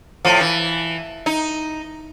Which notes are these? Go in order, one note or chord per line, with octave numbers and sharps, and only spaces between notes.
A2 F3
E3
D#4